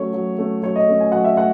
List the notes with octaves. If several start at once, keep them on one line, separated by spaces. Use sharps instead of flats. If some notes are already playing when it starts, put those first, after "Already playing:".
Already playing: F#3 A3 C#4 C#5
F#3
A3 C#4
F#3 C#5
D#5
A3 C#4
G#5
F#3 F#5
E5
A3 F#5